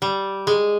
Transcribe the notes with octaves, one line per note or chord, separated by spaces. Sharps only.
G3
G#3